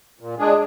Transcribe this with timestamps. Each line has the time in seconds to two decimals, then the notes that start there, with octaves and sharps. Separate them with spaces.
0.20 A#2
0.39 G#3 D4 G#4